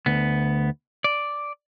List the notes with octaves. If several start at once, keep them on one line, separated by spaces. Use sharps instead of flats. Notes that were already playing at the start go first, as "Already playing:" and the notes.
D2 B3
D5